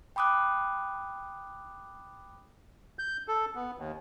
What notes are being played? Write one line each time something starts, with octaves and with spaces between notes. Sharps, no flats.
G5 B5 D6 D#6 F#6
G6
A4
B3
D#2